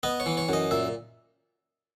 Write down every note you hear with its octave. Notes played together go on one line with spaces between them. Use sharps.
B3 D#5
C#5
E3
C#5
F#2 D#5
A#2 E5